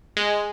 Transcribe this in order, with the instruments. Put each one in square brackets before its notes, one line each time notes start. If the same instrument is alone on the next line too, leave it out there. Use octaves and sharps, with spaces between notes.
[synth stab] G#3